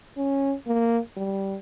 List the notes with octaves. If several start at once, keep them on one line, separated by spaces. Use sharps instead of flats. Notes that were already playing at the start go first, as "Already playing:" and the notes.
C#4
A#3
G3